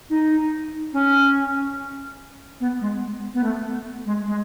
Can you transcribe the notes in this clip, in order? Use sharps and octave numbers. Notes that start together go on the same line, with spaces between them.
D#4
C#4
B3
G#3
B3
A3
G#3
G#3